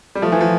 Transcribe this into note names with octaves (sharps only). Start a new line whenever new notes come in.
G3
F3 A3
E3
F3